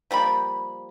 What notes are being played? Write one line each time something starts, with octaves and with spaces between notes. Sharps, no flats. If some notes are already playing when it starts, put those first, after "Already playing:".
F3 G3 A#3 B5